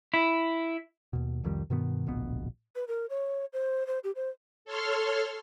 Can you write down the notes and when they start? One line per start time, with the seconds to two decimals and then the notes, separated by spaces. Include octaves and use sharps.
0.14 E4
1.13 D#2 B2
1.43 C2 F2 D#3 G3
1.70 G2 B2 D#3 B3
2.06 D1 A#1 B2 B3
2.76 B4
2.88 A#4
3.10 C#5
3.53 C5
3.87 C5
4.04 G4
4.16 C5
4.65 A4 C#5 C6 F6